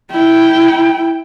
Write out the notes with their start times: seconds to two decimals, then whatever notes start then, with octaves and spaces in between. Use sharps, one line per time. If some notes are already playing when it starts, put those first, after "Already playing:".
0.11 E4 G5